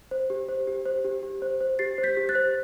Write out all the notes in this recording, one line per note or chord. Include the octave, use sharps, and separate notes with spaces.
C5
G4
C5
G4
C5
G4
G4
C5
C5
G4 A6 C7
C5
G6 B6
G4
F#6 A6
C5